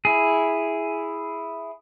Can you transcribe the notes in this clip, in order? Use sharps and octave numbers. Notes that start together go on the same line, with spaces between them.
E4 G#4